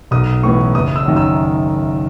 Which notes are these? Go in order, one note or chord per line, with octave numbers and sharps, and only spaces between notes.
B1 D#6
A2 E3 B3 C#6
F#1 D#6
E6
F#2 D#3
E6